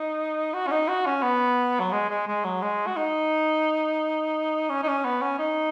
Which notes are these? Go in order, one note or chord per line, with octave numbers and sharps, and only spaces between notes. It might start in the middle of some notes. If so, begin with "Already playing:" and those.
Already playing: D#4
F#4
C#4
D#4
F#4
C#4
B3
F#3
G#3
G#3
G#3
F#3
G#3
F#4
D#4
C#4
D#4
C#4
B3
C#4
D#4